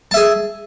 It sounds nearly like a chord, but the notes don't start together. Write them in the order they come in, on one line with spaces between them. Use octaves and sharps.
A5 E5 G#4